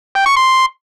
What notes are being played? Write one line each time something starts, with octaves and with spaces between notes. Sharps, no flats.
G5
C#6
C6